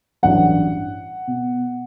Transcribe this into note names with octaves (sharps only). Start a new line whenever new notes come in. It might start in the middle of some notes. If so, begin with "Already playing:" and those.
A1 G2 F#3 F#5
B2